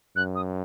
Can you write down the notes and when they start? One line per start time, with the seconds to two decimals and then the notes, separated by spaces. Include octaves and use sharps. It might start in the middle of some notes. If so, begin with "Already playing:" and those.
0.16 F#2 F#6
0.35 D#6